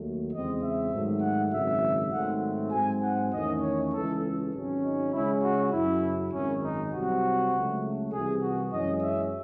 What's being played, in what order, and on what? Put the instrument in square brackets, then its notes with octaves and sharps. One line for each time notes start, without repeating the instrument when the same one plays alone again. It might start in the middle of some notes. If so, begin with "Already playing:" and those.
Already playing: [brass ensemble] D#2 D#3 F#3 A3
E2 C#3 G#3 C4 D#5
E5
G#2 D#3 F#3 A3
F#5
G#1 F#2 C#3 F#3 E5
G#2 D#3 F#3 A3 C4 F#5
G#2 F#3 C4 G#5
F#5
E2 D#3 A3 C#4 D#5
C#5
C#2 C#3 E3 A4
G#1 G#2 F#3 C#4
D#4
C#2 C#3 G#3 C#4 E4
F#4
F#2 C#3 F#3 E4
G#1 F#2 D#3 C#4
D#4
C2 C3 F#3 C4 F#4
C#2 C#3 F#3 A3
C2 C3 E3 G#4
F#4
F#2 E3 G#3 C#4 D#5
E5